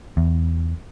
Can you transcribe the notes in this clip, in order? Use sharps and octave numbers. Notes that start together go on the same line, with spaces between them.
E2